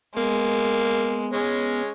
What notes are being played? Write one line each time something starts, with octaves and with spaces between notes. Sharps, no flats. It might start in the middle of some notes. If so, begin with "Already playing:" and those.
G#3 A#3 B3
G#3 C#4 C#5